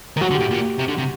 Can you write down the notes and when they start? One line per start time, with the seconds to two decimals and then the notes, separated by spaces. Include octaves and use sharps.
0.17 D#3
0.21 F#3 F#4
0.30 D3
0.35 G4
0.40 A2
0.50 A#2
0.78 C3
0.88 D3
0.98 C3